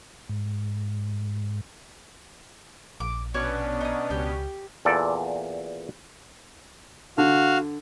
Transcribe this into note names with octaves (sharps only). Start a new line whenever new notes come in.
G#2
A#1 D6
B2 B3 C#4 D4 F#4 C#5 D5
D#4 D#6
C#2 G4
E2 A#2 A4 D5
D3 F#4 F5